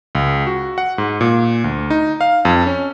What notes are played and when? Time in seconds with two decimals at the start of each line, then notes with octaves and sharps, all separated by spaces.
0.15 C#2
0.46 F#4
0.78 F#5
0.98 G#2
1.21 A#2
1.64 D2
1.90 D#4
2.21 F5
2.45 F2
2.66 C#4